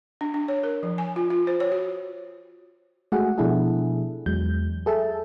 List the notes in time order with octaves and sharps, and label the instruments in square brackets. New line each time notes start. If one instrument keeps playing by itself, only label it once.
[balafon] D4
D4
C#5
A#4
F3
G#5
F4
F4
C5
C#5
F#4
[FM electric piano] G#3 A3 F#4 G#4 F#5
B2 F3 D4 E4 G#4 A4
E2 F#3 G#3 G6
G#4 A4 E5 A5